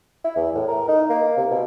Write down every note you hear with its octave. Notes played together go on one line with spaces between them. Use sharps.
E4
E2
A2
A#4
D#4
A#3
A#3
C3
B2